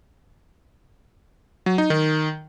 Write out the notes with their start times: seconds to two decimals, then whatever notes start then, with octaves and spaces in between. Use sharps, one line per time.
1.66 F#3
1.78 D#4
1.90 D#3